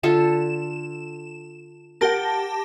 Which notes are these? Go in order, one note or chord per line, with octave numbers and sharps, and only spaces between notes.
D3 F4 A4 E7
G4 A#4 F#5 A5 A#6